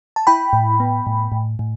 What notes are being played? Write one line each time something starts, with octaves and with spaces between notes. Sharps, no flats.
A5
E4 G5 B5
A2
B3
A2
A2
A2